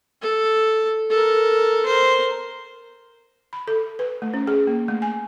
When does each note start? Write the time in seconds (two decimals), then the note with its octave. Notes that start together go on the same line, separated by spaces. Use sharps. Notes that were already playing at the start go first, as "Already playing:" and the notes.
0.22 A4
1.10 A4 A#4
1.86 A#4 C5
3.53 B5
3.68 A4
3.99 B4
4.22 A3
4.34 C#4
4.47 G#4
4.67 A#3
4.88 A3
5.02 G#5